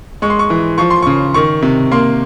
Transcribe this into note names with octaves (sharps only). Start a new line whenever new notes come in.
G#3 C#6
C6
C#6
E3
F3 C#6
C6
C#3 C#6
D#3 C#6
C3
A#3 C6